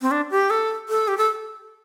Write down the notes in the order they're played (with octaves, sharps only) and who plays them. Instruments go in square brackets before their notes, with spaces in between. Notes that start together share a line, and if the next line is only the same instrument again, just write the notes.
[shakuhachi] C4
D4
G4
A4
A4
G4
A4